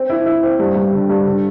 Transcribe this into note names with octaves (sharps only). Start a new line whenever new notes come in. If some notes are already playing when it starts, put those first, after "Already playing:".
Already playing: C4
E4
E4
C4
G2
G2
D3
G2
D3